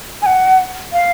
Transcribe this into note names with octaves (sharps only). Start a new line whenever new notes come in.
G#5
F#5
F5